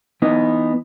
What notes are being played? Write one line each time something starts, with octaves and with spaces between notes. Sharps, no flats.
E3 B3 D#4